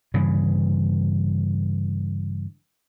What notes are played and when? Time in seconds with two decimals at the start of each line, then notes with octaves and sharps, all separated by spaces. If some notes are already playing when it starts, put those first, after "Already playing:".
0.14 G2 C#3 E3